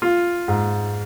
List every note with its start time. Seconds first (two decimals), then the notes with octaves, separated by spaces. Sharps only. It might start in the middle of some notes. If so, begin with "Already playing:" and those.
0.02 F4
0.48 G#2